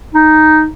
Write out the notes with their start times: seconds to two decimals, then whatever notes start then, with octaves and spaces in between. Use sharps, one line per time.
0.14 D#4